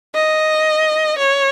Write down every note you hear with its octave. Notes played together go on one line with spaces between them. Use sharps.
D#5
C#5